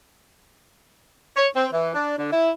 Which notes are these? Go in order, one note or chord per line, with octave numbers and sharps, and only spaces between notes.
C#5
C4
E3
D4
D3
E4